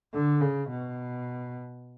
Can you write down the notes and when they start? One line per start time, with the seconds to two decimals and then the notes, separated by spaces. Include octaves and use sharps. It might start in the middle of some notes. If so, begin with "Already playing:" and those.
0.13 D3
0.41 C#3
0.69 B2